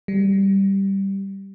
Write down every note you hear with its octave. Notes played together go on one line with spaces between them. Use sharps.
G3